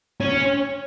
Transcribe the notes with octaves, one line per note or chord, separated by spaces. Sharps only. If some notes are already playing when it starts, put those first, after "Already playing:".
C#4 C#5